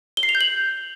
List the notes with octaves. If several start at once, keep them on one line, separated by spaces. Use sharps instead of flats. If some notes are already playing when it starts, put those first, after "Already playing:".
G7
C7
F7
G6
F#7